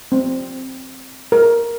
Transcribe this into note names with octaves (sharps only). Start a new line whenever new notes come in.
C4
A#4